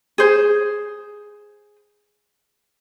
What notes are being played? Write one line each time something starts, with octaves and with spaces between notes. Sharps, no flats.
G#4 C5